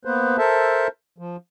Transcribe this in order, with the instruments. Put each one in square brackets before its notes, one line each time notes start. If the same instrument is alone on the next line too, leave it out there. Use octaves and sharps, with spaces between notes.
[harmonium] A#3 B3 B4 C5
A4 A#4 C5 E5 A5
F3